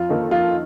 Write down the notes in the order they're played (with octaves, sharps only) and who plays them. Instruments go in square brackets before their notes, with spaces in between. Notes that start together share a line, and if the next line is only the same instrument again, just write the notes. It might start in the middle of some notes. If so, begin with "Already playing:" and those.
Already playing: [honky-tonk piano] F2 [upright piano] F4
[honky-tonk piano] D#3 A#3 D#4 A4
[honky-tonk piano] F2 [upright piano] F4